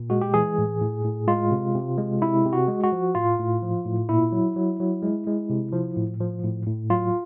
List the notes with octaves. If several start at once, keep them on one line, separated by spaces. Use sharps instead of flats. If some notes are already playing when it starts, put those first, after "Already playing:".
Already playing: A#2
G#3 F#4
G4
E3 G#4
A2
A2
A2
G#3 F4
C3
C3
G#3
C3 E4
C3
F#4
G#3
F#4
F3
A2 F4
A2
F3
A2
A#2 E4
F#3
F#3
F#3
G#3
G#3
C3
F3
A2
F3
A2
A2
F#3 F4